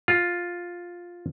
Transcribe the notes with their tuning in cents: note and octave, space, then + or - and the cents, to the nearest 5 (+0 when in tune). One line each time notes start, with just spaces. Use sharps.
F4 +5